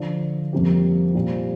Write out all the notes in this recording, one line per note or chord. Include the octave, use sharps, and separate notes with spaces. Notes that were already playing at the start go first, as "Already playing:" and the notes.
Already playing: D3 F3 D4 F4
F2 C3 G3 A#3 G4
A#2 G3 C4 G4